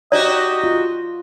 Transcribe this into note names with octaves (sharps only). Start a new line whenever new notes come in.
D#4 F#4 G4 D5 D#5
F4